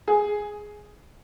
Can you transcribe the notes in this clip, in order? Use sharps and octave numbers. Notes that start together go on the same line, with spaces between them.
G#4